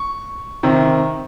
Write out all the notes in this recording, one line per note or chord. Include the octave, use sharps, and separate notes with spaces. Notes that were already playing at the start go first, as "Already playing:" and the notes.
Already playing: C#6
C3 D#3